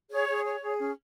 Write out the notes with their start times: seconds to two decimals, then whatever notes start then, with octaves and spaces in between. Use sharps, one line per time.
0.10 G#4 C#5
0.28 G#4
0.44 C#5
0.62 G#4
0.79 C#4